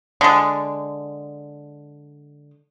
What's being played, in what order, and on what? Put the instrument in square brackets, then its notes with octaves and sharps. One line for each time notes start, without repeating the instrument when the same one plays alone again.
[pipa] D3 G#3